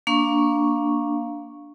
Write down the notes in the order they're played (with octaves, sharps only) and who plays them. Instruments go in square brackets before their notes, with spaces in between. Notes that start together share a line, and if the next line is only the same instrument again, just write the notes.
[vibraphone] A#3 D4 F5 C#6